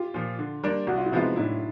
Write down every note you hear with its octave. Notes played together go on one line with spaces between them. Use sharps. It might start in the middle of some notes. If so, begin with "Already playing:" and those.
Already playing: F4 G4
A#2 F3
D3
G3 A#3 D4
C2 F#4
F4
E4
C3 F3 G#3 B3 D#4 F4
A2 D4 E4